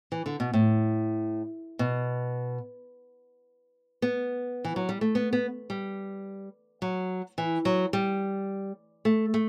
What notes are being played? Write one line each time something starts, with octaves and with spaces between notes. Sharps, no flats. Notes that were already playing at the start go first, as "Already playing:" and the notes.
E3
D3
B2
A2
B2
B3
E3
F#3
G3
A3
B3
B3
G3
F#3
E3
F#3
G3
A3
A3